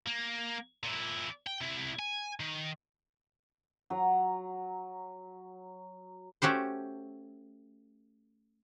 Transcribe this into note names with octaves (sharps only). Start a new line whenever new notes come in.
A#3
A#2 E4
G5
C3 E4
G#5
D#3
F#3 A#5
A3 C#4 F#4 G4 C5